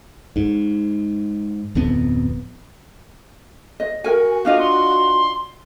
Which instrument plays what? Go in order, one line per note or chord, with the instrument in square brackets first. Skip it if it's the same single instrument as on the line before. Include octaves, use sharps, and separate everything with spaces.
[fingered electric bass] G#2
D1 F2 B3
[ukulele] D#5
[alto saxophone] F#4 [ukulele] A#4 G#5
[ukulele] D4 F4 D#5 [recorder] F5
[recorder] C6